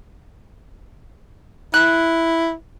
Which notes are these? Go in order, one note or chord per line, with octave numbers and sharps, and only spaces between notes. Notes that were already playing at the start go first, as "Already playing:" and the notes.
E4 F#6